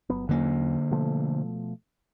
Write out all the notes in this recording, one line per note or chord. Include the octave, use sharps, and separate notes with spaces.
G1 F#3 B3
E2 D3 F#3 A#3 C#4
B2 F3 A3